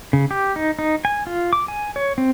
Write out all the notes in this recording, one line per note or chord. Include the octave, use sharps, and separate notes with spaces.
C#3
G4
D#4
D#4
G#5
F4
D6
G#5
C#5
C4